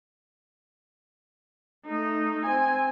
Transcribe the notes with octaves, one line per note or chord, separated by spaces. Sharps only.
A3 D#4
C4 G#5